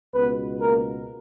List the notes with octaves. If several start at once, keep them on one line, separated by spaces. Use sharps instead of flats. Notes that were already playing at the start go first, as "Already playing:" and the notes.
C#2 B2 B3 B4
A#3 A#4